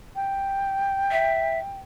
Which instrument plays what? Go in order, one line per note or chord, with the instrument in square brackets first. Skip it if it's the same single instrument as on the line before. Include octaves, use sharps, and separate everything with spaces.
[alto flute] G5
[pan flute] E5